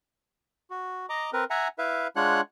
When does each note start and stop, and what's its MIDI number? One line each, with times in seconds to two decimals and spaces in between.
0.70 1.06 66
1.09 1.30 75
1.09 1.30 82
1.09 1.30 86
1.33 1.44 60
1.33 1.44 70
1.33 1.44 71
1.50 1.68 76
1.50 1.68 78
1.50 1.68 80
1.50 1.68 82
1.78 2.07 64
1.78 2.07 71
1.78 2.07 76
1.78 2.07 77
2.16 2.41 56
2.16 2.41 62
2.16 2.41 65
2.16 2.41 73
2.16 2.41 78
2.16 2.41 90